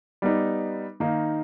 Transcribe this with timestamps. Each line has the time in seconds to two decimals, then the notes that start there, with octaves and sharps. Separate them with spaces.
0.22 G3 B3 D#4
1.00 D#3 A#3 D#4